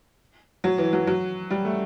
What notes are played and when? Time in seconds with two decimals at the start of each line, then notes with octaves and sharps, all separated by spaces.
0.64 F#3
0.78 E3
0.93 F#3
1.07 F#3
1.50 G3
1.65 A3